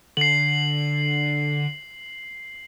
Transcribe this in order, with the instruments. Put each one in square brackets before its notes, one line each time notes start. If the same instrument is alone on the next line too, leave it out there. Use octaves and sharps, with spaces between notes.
[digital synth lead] D3 [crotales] C7 F#7